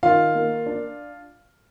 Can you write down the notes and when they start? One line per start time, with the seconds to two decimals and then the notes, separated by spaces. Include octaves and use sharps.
0.03 D#3 F4 F5
0.35 A#3
0.66 D4